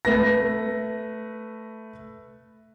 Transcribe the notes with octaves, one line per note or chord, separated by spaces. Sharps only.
A3 B4 A#6